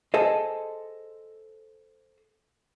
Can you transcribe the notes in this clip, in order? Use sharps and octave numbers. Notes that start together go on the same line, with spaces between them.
G#4 A4 C5 D#5